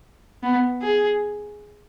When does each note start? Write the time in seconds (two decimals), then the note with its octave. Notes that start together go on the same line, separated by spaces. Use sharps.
0.43 B3
0.83 G#4